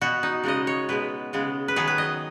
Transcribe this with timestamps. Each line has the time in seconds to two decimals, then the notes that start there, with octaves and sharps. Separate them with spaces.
0.01 B2 B3 F#4
0.23 D#4
0.43 C#3 G#3 B3 D#5
0.67 C#5
0.89 B2 G#3 B3 B4
1.33 C#3 G#3 B3
1.68 B4
1.76 D#3 F#3 B3 G#4
1.87 B4
1.98 D#5